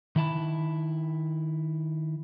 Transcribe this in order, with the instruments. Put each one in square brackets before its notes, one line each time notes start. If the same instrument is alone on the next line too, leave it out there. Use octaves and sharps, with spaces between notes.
[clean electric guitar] D#3 E4 A5 B5